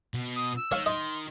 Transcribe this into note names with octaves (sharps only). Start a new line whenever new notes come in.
B2
D#6
E6
D#3 C#5 F5 C#6
D#5 C6